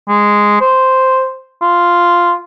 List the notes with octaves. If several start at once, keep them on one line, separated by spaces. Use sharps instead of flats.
G#3
C5
F4